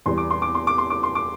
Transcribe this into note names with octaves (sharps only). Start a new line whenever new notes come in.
E2 E3 G3 C6
D6
C6
D6
C6
D6
C6
D6
C6
D6